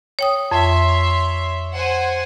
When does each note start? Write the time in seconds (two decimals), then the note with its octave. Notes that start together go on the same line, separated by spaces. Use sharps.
0.19 C#5 G5 D#6
0.51 F2 C#5 E5 C6
1.73 C5 F#5 G#5